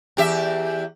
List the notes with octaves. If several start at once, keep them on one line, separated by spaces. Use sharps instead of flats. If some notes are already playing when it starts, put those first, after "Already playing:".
E2 G4 E5